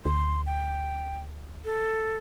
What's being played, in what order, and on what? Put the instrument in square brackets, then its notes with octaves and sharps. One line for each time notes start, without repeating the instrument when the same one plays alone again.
[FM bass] D2 [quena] C6
[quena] G5
A4